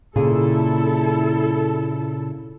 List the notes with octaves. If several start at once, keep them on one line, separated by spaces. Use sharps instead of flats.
A#2 C#3 E4 G#4 A4